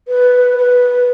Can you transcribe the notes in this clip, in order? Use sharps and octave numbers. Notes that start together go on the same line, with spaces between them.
B4
B4